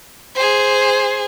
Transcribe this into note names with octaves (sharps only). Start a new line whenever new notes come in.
G#4 C5